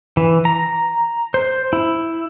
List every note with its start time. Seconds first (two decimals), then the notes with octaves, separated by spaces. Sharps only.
0.17 E3
0.45 A#5
1.34 C5
1.73 E4